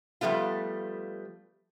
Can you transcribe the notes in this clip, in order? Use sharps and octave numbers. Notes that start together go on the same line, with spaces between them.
F3 G3 A3 B3 F4